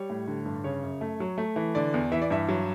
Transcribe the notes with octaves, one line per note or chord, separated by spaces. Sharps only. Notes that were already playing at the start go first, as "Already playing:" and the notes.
Already playing: G3 C#5
A2
D3
G2
C#3 C#5
F#2
A3
F#3
A3
E3
D3 D5
E2
E3 E5
D5
G2 E5
F#3